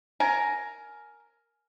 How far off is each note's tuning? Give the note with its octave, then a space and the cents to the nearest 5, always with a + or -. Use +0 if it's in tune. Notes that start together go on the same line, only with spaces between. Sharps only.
A#4 +0 G#5 +15